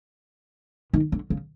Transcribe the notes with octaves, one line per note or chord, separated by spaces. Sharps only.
D#3
D3
C#3